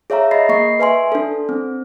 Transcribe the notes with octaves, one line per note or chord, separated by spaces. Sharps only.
G#4 C#5 E5 F5 A#5
G#4 D#5 B5 A#6 C7
A#3 D#5 C#6 C7
B4 E5 G#5 C6
D4 A4
C4